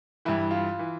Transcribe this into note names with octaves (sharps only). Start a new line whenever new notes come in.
G2 E3 E4
F4
E3